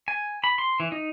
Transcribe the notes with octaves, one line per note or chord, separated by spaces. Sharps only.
G#5
B5
C6
E3
D#4